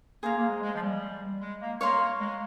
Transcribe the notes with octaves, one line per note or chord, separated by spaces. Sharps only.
A#3 G#4 C5 F5
A#3
G#3
G#3
F3
G3
G#3
A#3
A#3 C#5 F5 C6
G#3